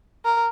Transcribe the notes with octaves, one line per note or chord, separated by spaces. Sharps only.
A#4